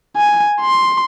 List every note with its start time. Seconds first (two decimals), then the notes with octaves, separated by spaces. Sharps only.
0.17 G#5
0.61 C6